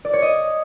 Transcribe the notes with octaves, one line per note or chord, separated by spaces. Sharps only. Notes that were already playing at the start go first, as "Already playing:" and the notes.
D5
C#5
D#5